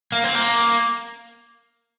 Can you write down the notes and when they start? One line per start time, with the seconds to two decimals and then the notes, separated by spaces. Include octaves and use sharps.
0.12 A#3
0.24 C4
0.35 A#3